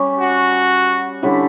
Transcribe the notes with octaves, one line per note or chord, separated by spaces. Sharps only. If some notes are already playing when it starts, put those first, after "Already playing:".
Already playing: G3 C#4 G4
F#4
D3 G3 C#4 E4